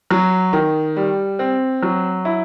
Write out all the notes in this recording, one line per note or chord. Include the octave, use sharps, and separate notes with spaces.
F#3
D#3
G3
C4
F#3
E4